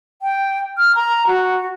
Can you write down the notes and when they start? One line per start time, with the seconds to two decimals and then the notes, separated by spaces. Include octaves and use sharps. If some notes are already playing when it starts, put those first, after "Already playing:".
0.22 G5
0.78 F6
0.95 A#5
1.27 F#4